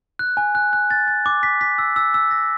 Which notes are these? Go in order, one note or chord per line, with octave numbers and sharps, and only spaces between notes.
F#6
G#5
F#6
F#6
A6
A6
D6
B6
B6
E6
E6
E6
A#6